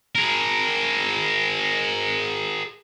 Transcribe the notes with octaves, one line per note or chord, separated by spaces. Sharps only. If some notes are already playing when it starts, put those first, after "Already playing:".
G#4 A#4